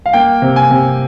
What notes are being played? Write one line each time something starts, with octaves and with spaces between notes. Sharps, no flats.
F5
A#3 G5
C3
G#5
C3